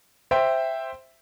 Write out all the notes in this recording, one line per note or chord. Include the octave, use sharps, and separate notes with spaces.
C5 E5 G5